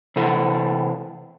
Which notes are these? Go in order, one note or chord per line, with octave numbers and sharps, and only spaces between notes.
C3 E3 A4